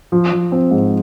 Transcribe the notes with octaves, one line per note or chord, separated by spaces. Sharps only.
F3
F3
C4
G#2